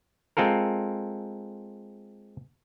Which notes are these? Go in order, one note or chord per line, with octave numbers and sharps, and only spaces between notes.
G#3 C4 F4 A4 A#4